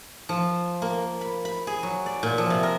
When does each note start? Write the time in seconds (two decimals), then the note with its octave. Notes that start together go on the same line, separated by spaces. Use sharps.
0.29 F3
0.82 A#3
1.21 B5
1.45 B5
1.67 G#4
1.83 F#3
2.06 D5
2.23 A#2
2.38 F3
2.50 C3
2.63 A#4